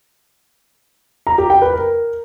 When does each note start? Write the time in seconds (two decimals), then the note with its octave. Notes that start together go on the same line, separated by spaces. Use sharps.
1.27 A#5
1.38 G4
1.50 G5
1.62 B4
1.73 A#4